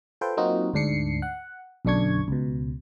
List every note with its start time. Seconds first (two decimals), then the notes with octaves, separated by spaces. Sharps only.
0.21 F4 A4 B4 C5 G5
0.37 F#3 A#3 C4 D#4 F4 F#4
0.74 D2 G#2 D4 C7 C#7
1.22 F#5
1.85 B1 F#2 D3 D4 C#6 G#6
2.28 C#2 B2